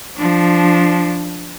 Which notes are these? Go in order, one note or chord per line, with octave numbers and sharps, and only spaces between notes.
F3 D4